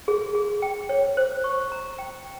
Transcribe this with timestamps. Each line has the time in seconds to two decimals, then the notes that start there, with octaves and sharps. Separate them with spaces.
0.08 G#4
0.35 G#4
0.62 G5
0.89 C#5
1.17 C5
1.44 C#6
1.72 A#5
1.98 G5